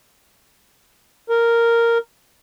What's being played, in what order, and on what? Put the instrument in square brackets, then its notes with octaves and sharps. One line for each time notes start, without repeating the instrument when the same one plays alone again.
[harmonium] A#4